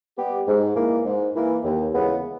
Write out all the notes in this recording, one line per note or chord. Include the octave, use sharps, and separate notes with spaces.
G3 B3 G4
G#2
E3 A#3
G#2
E3 A#3
D#2
C#3 E3 G#3 B3